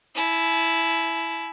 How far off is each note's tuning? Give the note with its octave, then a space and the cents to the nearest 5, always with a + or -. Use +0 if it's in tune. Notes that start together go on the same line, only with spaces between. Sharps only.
E4 +0 G#5 +40